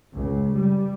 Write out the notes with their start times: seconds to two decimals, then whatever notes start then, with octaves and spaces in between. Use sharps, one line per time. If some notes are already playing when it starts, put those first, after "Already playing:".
0.13 C#2
0.54 G3